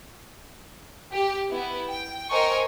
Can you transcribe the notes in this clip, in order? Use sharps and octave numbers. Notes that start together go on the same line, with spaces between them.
G4
B3 E4
G5
A#4 C5 D#5 G5 G#5 C#6